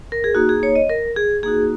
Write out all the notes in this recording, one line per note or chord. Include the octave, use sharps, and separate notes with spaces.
A#4
G#4
A#3 D#4 F#4
G#4
C#5
D#5
A#4
G#4
A#3 D#4 F#4 G#4